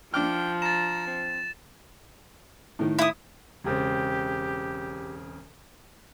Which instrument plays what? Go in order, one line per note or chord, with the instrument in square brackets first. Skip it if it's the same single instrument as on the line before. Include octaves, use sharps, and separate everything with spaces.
[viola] F3 [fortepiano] D4 D6 F6 [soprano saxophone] G5
[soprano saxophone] A#5 [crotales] A6 E7
[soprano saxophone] C4
[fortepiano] A2 D#3
[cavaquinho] E4 D#6
[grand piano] E1 C#3 C4 [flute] G4